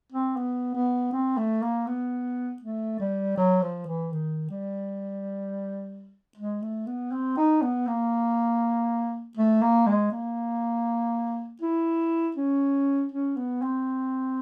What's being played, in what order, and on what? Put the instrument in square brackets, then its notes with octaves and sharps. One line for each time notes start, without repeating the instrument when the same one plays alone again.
[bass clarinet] C4
B3
B3
C4
A3
A#3
B3
A3
G3
F#3
F3
E3
D#3
G3
G#3
A3
B3
C4
D#4
B3
A#3
A3
A#3
G#3
A#3
E4
C#4
C#4
B3
C4